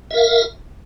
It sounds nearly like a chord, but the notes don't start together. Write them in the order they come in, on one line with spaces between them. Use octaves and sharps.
E5 A#4 F5